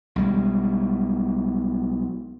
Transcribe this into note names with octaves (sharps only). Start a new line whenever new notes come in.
B1 G3 G#3